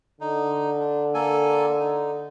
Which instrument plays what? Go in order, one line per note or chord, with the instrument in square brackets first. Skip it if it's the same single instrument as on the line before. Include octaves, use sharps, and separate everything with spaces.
[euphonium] D3 [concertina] D#4
[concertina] D4
A#3 A4 G#5
D#4